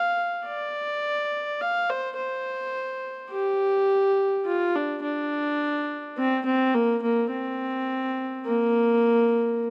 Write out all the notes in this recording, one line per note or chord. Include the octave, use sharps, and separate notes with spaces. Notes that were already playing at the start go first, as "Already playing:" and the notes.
Already playing: F5
D5
F5
C5
C5
G4
F4
D4
D4
C4
C4
A#3
A#3
C4
A#3